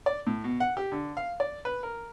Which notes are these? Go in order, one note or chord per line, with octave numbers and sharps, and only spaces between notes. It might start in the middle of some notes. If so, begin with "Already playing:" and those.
D5
A2
B2
F#5
G4
D3
F5
D5
B4
A#4